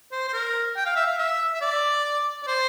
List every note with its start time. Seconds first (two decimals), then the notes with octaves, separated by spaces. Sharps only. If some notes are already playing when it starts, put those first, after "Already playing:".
0.12 C5
0.28 C5
0.33 A#4
0.76 G5
0.86 F5
0.96 E5
1.06 F5
1.19 E5
1.54 E5
1.61 D5
2.43 D5
2.47 C5